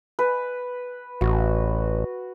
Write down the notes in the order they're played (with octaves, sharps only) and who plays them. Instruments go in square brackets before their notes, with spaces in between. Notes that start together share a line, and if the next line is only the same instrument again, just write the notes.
[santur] B4
[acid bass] A1 [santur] F#4